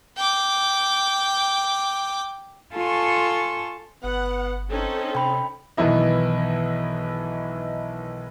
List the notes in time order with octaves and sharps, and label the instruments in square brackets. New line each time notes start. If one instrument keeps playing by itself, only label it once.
[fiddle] G5 D6
[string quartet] F4 A4 G#5 A5 C6 C#6
[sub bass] G1 [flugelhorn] B3 [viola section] F#5
[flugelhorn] C4 [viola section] C#4 D#4 A4
[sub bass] C3 [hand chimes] G5 B5
[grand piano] B1 D#3 E3 B3 E4 D#5